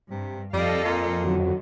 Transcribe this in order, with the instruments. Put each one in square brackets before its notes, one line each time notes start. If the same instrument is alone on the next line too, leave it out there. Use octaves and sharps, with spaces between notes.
[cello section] G2 [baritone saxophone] C3
[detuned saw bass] F2 [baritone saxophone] G3 [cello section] A4 D#5 F5
[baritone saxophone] A#2
[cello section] F#2 D3 D#3 [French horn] F#3